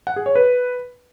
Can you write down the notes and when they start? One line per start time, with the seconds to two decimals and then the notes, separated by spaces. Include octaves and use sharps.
0.07 F#5
0.16 G#4
0.26 C#5
0.35 B4